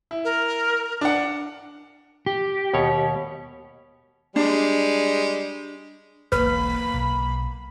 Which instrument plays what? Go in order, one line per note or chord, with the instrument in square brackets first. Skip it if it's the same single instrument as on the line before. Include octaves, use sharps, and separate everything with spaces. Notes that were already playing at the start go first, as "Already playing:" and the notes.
[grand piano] E4
[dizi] A#4
[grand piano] D4 F#5
[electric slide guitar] G4
[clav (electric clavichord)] D#2 B2 C#5
[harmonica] G3 G#3 [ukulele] D4
[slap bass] E1 B1 D3 [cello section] A#3 [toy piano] B4 [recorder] B5
[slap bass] B1